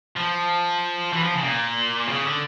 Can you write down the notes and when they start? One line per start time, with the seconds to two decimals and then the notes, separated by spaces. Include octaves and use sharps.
0.16 F3
1.13 E3
1.23 F3
1.34 C#3
1.44 A#2
2.08 C#3
2.24 D3